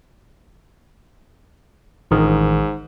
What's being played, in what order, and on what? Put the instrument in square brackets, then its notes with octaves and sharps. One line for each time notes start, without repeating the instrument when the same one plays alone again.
[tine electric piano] A1 D#3 [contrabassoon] G#2